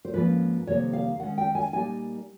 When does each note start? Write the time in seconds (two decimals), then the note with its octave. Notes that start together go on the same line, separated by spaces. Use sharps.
0.05 C5
0.14 G#2 F3 A#3 C#4 B4
0.67 F2 C3 D#3 G3 A#3 C#5
0.93 F5
1.20 D#3 G#3 C#4 F#5
1.38 G5
1.55 G#5
1.73 A#2 G3 A#3 D#4 G#5